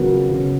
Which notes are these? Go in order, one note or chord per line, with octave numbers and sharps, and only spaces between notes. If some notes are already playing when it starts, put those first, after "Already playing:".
Already playing: C#3 F#3 B3 F#4 A#4
C#3